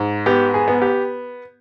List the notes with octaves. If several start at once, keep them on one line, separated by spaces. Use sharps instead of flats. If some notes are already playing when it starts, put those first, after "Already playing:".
Already playing: G#2
B3 G4
G#4
B3
G4